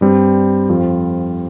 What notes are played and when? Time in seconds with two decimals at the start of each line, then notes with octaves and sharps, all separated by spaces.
0.01 G2 G3 C4
0.69 F2 F3 C4 F4